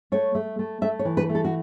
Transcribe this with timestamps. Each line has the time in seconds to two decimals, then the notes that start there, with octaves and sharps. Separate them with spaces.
0.12 A3 C#5
0.35 A3
0.59 A3
0.81 A3 E5
0.99 C#5
1.05 E3
1.17 B4
1.29 A3
1.35 A4
1.45 F#4